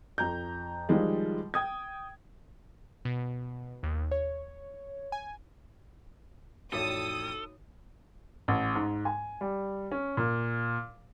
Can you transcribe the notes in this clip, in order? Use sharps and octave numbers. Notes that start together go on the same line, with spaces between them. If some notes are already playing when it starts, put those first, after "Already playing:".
F2 A#5 G6
D#3 F3 G3 G#3
G5 D#6 G#6
B2
D#2
C#5
G#5
A1 F2 D#4 F#4 A4 C#5 D5 D#6
A1
G#2
G#5
G3
C#4
A#2